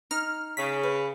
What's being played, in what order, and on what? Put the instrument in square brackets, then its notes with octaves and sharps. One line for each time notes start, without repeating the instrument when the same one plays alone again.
[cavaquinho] D#4 [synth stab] F6
[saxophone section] C#3 [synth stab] B6
[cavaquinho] B4